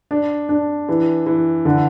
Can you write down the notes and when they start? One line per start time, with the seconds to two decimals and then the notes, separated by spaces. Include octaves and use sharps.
0.11 D4
0.49 D4
0.89 E3
1.26 E3
1.65 D3